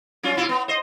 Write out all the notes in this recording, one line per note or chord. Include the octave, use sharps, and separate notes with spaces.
F#3 C#4 F4
B2 E4 F4
B3
C5 D#5